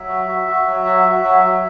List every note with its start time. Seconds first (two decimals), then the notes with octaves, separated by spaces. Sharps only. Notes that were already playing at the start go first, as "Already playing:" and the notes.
Already playing: F#3 E5
0.09 F#4
0.28 F#4
0.48 F#4
0.67 F#3
0.86 F#4
1.05 F#4
1.24 F#3
1.44 F#3